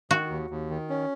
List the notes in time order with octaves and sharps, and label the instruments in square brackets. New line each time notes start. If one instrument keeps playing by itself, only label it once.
[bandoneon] D#3 [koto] F#4
[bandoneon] D#2
D#2
D#3
C#4